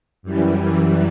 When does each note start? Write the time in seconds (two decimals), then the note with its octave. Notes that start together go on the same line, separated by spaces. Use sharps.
0.23 F#2 E3 G3